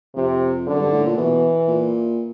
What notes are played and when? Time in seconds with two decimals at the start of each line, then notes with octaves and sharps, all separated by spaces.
0.15 F2 C3
0.66 F#2 D3
0.79 G2
0.92 A2
1.04 A#2
1.17 B2 E3
1.68 A#2